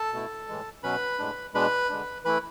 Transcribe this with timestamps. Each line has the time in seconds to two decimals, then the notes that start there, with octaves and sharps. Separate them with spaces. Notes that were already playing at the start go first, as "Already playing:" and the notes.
Already playing: A4 A5
0.12 B2 A3 E4
0.48 A2 E3 G#3
0.83 B2 F#3 C#4 B4 B5
1.19 A2 G#3 D4
1.54 B2 G#3 D4 B4 B5
1.89 D3 G#3 D4
2.24 E3 A3 E4 B4 B5